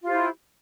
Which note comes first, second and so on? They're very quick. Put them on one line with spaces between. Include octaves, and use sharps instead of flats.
F4 G4 C5 E4